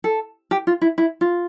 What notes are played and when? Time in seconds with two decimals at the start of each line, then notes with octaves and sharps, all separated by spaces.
0.04 A4
0.51 G4
0.67 F4
0.81 E4
0.98 E4
1.21 F4